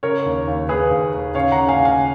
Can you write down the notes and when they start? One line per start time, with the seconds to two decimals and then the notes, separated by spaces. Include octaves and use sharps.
0.03 C#3 A#4 C#5
0.26 D#2
0.48 D#2
0.69 D#2 G#4 B4
0.91 D#2
1.14 D#2
1.35 C#3 C#5 F5
1.52 F#5 A#5
1.58 C#3
1.69 F5 G#5
1.79 C#2
1.85 F5 G#5